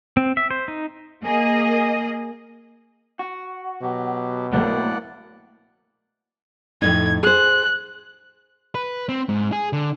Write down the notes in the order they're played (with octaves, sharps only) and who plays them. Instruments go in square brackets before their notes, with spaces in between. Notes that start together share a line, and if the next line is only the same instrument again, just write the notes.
[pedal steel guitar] C4
E5
C5
D#4
[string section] A#3 G#4 D#5
[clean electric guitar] F#4
[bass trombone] B2 [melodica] F#3 G4
[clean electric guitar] A2 F#3 A3 [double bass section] A#3 [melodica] D5 F#5
[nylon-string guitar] F2 A2 D#4 [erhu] G#6
[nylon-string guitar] G#4 C5 [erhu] F#6
[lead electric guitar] B4
C4
G#2
G#4
D3